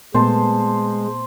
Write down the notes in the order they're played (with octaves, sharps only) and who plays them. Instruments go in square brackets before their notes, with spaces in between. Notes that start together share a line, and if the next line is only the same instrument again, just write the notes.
[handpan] A#2 A3 B3 [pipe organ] G#3 [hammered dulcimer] C5 A5